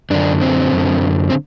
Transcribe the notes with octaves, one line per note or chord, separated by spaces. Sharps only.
F#2 D3 D4
C4
F#2 D3
C4